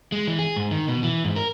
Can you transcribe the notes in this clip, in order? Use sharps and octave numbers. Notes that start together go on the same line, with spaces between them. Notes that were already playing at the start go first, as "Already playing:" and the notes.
G#3
E3
G#4
G#2
D#3
B2
E3
G#2
A#4